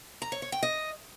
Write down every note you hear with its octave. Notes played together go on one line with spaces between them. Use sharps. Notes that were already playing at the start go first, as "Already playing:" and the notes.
A#5
C#5
C#5
G5
D#5